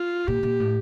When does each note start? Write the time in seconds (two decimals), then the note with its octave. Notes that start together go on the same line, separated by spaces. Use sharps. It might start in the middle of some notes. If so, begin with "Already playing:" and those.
Already playing: F4
0.27 A#2 G4
0.43 A#2
0.60 A2